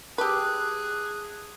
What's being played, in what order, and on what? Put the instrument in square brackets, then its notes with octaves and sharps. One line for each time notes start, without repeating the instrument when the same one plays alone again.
[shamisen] G4 B4 [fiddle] G#4 [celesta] A5 D6 E6 [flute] F#6